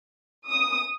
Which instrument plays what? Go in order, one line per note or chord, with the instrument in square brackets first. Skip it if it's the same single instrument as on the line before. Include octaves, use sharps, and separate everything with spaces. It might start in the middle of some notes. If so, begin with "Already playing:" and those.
[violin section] D#6